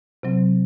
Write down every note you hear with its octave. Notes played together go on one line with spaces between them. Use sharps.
C3 F#3 C4